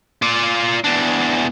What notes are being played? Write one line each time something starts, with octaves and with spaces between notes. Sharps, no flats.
F4 D5
E2 D4